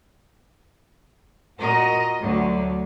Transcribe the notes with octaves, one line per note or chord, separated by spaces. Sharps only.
A#2 F#4 A#4 D#5
D2 D3 F#3